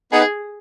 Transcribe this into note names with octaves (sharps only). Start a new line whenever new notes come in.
B3 D#4 G#4